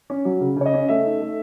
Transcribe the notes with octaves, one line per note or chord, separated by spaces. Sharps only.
C#4
F#3
C#3
C#3 C#5
D#5
C#4
A3 E5
D#4
A3